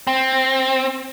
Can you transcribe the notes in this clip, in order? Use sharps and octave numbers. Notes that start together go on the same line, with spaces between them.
C4